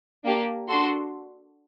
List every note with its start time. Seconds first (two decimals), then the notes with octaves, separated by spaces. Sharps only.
0.25 A#3 D4 G4
0.68 D4 F#4 A4 C6